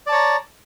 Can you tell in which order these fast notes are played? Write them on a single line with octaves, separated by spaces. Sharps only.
D5 A5 C#5 A#5